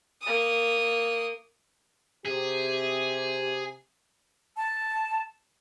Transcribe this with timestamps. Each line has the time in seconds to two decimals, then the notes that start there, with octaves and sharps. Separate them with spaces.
0.22 A#3 D#6
2.25 C3 G4 G#4
4.57 A5